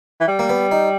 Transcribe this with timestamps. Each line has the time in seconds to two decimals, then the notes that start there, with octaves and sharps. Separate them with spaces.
0.21 E3
0.28 G3
0.39 A#3
0.49 B3
0.71 D#4